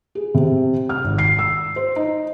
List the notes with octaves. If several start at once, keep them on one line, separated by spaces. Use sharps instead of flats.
G#4
C3
F6
G#1
C7
E6
C5
D#4